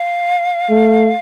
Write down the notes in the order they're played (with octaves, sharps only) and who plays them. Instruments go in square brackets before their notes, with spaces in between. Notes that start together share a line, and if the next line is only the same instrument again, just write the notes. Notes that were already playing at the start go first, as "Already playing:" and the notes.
Already playing: [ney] F5
[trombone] A3